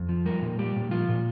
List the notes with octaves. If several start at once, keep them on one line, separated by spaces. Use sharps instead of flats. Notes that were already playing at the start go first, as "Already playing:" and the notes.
Already playing: F2
F3
G3 A#4
A#2
G3 G4
A#2
F3 F4
A#2